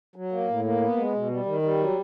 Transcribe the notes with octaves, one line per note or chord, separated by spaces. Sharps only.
F#3
A#3
A2
A#3
B3
G#3
B2
G3
D#3
G3
F#3